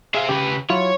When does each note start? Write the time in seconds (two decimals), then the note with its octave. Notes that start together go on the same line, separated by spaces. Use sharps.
0.15 G#4 C5 E5 F5
0.29 C#3 G4 B4
0.70 F#3 E4 F4 C#5